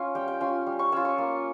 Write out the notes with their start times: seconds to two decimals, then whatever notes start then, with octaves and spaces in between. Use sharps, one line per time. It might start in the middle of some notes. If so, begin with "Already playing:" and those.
Already playing: C#4 F4
0.15 G3 G5
0.28 G5
0.40 C#4 F4 G#5
0.66 G3
0.79 C#6
0.92 C#4 F4 E6
1.05 C#6
1.18 A#3